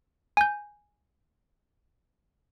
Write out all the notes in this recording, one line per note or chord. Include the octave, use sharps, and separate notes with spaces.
G#5 G6